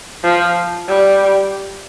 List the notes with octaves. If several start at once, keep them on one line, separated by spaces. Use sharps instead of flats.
F3
G3